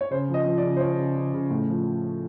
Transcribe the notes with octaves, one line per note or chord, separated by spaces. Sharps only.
C#5
C#3 C5
F3
D#5
F3
D5
C#3
C5
F3 C#5
C#3
C#3
C#3
A2
F3